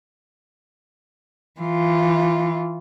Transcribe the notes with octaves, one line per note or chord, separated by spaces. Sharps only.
E3 F4